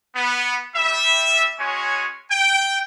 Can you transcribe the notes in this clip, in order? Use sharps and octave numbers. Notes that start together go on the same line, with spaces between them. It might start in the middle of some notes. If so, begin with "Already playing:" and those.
B3
G3 E5
G#3 C#4 F#4 C#5 G#5
G5